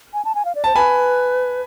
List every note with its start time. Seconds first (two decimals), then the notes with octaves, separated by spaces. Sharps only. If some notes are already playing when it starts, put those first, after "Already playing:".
0.14 G#5
0.25 A5
0.35 G#5
0.45 F5
0.55 D5
0.64 C5 A5
0.76 B4 G#5 B5